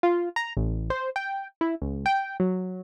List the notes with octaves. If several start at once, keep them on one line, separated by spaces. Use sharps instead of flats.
F4
A#5
A1
C5
G5
E4
C#2
G5
F#3